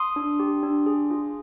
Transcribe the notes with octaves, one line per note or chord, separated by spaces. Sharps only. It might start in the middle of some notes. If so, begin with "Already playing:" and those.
Already playing: C6 D#6
D4
G4
D4
G#4
F4